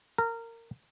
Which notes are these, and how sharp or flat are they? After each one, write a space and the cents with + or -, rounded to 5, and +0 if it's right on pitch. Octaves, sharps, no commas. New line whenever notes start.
A#4 -20